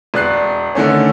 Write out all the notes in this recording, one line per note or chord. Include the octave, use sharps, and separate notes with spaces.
E1 D5 F#6 C7
D3 D#3 A3 C#4